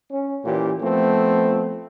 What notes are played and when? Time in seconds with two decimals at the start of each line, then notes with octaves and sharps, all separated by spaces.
0.11 C#4
0.44 A#2 E3 C#4 G4
0.81 F3 A3 B3 C4